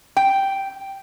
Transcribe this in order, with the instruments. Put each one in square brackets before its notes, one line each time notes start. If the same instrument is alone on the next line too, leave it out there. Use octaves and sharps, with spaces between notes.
[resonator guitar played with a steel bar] G5